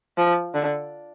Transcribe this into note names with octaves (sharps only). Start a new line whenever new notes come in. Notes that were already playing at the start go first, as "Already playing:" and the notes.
F3
D3